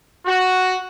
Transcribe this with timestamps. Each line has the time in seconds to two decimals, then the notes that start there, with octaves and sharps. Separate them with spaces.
0.25 F#4